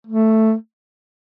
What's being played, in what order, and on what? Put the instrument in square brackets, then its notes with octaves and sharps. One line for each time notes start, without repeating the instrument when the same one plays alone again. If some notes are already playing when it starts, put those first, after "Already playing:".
[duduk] A3